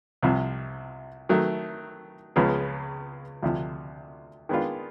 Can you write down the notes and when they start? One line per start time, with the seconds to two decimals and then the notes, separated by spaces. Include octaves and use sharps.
0.23 C2 C3 F3
1.29 D#3 F#3 A3
2.36 C#2 C#3 F3 G#3 B3
3.42 D2 C3 F3
4.49 D#3 G#3 B3 D4 F4